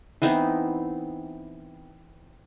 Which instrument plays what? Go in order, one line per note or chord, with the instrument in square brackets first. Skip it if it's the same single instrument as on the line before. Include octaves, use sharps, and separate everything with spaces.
[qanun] E3 B3 C4 D#4